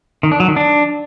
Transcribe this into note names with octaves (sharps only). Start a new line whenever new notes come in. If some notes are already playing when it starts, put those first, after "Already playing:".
D#3
D4
F#3
D#3
D4